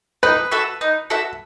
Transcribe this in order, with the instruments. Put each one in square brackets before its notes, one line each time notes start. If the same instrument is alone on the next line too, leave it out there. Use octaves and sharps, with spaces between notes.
[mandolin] D#4 [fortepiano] B4
[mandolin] F#4 A4 E5
D#4
F#4 A4 E5